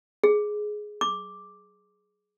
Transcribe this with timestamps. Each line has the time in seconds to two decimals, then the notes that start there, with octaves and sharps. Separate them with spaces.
0.24 G#4
1.01 D6